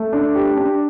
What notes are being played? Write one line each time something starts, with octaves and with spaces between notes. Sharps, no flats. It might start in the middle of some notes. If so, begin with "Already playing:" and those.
Already playing: A3
D4
G4
D4